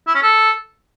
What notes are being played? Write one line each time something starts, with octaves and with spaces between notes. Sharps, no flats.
E4
C#4
A4